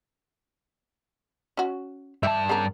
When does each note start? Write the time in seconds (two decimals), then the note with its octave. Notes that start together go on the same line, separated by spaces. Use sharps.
1.57 C#4 F#4
2.23 G2 E5 A5
2.49 C#3 B3 A#4